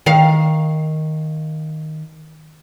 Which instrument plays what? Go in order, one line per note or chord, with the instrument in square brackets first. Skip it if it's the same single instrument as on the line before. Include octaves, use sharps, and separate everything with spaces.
[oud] D#3 F5